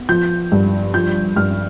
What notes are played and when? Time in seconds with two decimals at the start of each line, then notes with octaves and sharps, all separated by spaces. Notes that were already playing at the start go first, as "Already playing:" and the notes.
Already playing: B3
0.09 F3 G6
0.52 G2
0.94 F3 G6
1.36 G2 F6